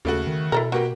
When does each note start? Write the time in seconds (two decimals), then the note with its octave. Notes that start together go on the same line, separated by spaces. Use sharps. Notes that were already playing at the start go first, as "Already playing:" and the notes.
0.05 D#2 C#3 A3 F#4
0.27 D#3
0.52 B2 E4 A4 A#4
0.72 A#3 F#4 G4 B4